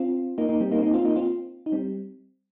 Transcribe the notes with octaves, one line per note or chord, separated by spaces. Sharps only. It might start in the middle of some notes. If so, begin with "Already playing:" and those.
Already playing: C4 F4
A#3 D#4
A#3 D#4
G3 C4
A#3 D#4
C4
A#3 D#4
C4 F4
A#3 D#4
C4 F4
D#4
G3 C4